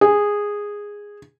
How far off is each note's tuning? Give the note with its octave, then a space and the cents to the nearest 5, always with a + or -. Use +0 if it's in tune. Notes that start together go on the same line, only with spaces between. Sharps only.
G#4 -10